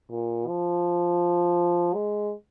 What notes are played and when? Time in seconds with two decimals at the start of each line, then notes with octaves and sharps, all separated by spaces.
0.10 A#2
0.47 F3
1.94 G#3